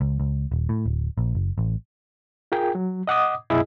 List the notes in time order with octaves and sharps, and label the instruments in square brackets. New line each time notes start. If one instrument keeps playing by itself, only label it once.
[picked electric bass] C#2
C#2
D#1
A2
D1
A#1
F#1
A1
[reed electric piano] F4 G#4 A#4 G5
F#3
D#5 F#5 D6 D#6
C2 F#2 B2 E4 G#4 D#5